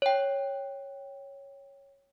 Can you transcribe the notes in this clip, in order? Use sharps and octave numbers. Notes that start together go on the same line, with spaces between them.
C#5 G5